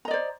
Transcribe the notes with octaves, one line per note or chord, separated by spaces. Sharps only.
C5 D5 D#5 A#5